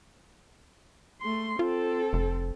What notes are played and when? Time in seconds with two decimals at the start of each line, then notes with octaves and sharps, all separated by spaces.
1.21 A3 C6
1.59 C4 F4 A4
2.13 F1